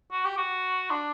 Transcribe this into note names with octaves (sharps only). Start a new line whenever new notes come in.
F#4
G4
F#4
D4